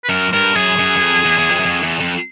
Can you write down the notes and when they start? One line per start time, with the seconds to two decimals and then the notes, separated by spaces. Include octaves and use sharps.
0.04 B4
0.09 F#2 A#4
0.32 G2 A#4
0.56 F#2 G#4
0.79 F#2
0.96 F#2
1.01 F2
1.25 E2
1.38 E2
1.49 F2
1.59 F#2
1.65 F2
1.83 E2
2.00 F2